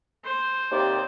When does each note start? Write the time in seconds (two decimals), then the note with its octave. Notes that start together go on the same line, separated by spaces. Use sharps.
0.25 C5
0.71 D#2 C3 D5